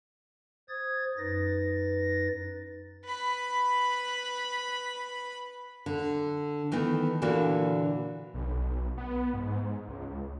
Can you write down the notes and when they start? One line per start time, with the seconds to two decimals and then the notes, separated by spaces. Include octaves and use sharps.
0.69 C5 D#6 G#6 A6
1.18 F#2 D#4 B4 A6 A#6
3.05 B4 B5
5.86 D3
6.72 D#3 E3 A3 B3
7.22 A#2 D3 E3 A#3 F#4
8.34 B1
8.97 B3
9.34 G#2
9.88 C#2